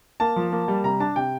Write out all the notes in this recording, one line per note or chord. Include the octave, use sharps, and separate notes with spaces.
A#3 A5
F3
A#3
G3
C3 A#5
D4 A5
C3 G5